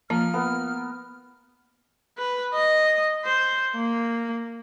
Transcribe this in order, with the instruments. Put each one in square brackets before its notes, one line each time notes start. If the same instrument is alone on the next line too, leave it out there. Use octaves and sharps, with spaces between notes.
[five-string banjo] F3 [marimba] A#3 [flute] F6
[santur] B3 A#4
[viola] B4
D#5
C5
A#3